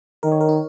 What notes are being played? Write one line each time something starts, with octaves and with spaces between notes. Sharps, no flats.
D#3 A#4
C#5
A#4
D#4